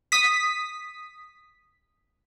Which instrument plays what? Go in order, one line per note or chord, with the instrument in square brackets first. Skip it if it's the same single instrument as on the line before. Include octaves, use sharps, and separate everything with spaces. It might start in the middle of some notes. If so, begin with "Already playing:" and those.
[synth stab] D#6 B6